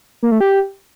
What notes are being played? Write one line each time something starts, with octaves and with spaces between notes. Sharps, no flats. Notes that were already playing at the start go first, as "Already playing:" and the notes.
A#3
A3
G4